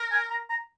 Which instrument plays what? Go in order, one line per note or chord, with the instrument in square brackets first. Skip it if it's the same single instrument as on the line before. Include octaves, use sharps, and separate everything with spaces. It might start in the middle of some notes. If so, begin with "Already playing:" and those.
Already playing: [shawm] A#4
[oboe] G#5
A#5
A#5